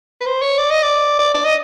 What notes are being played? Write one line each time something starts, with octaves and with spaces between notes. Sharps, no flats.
B4
C5
C#5
D5
D#5
D5
D5
D5
D#5